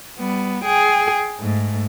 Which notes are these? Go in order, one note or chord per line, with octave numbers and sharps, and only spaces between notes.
G3 B3
G#4 G5
G#2 A3